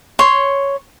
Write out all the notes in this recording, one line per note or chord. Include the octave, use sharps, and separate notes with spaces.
C#5 C6